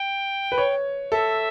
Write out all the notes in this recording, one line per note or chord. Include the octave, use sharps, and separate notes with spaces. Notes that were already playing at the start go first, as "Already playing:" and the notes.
Already playing: G5
B4
C#5
A4 E5